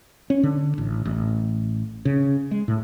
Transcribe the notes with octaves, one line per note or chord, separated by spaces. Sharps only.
C#4
D3
A1
A1
C#3
G#3
A2